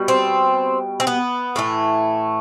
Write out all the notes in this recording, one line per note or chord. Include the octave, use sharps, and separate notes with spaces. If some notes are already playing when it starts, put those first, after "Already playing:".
Already playing: B2 G3
C4
C4
B3
A2 E3 A3